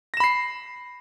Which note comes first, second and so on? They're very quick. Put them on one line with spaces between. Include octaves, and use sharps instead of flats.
A#6 E7 B5 C7